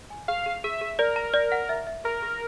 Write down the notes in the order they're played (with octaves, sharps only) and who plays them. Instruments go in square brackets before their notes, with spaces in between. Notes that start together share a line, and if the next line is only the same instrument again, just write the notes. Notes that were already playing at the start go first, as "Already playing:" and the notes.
[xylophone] G#5
[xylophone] G#4 [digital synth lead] F5
[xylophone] G#4
[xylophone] G#4 [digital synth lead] E5
[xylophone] G#4
[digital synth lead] A#4 [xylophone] D5
[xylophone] A#5
D5
F#5
E5
E5
[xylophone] G#4 [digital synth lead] A#4
[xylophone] G#4